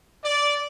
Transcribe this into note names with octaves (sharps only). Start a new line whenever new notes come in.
D5